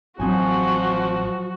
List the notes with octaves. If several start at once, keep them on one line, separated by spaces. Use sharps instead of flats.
A1 F3 F#3 C4 D#4 F#4 G#5